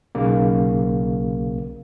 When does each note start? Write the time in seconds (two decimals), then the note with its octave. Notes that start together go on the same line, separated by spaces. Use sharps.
0.15 B1 C#3 A#3